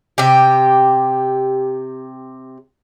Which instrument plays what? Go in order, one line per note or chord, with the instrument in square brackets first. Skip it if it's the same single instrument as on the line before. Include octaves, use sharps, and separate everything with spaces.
[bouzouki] C3 G4